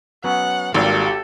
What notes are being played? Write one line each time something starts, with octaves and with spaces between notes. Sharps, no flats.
F#3 B3 C#4 F#5
G#1 G3 A#3 F4 G4 A4 F5